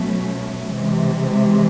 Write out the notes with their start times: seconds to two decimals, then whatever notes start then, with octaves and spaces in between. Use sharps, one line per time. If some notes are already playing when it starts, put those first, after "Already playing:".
Already playing: B2 F#3 A3 C#4
0.74 C3 E3 G#3